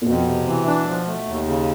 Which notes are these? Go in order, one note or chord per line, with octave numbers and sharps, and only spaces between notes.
A#2
F2 B2
C3
E3
D4
F3
A3
D#2
C#3